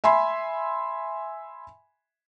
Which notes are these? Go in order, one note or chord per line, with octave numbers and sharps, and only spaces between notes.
E5 G#5 B5 C6